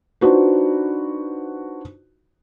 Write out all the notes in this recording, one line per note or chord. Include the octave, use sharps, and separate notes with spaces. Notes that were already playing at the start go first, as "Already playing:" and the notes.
D4 D#4 F4 F#4 B4 C5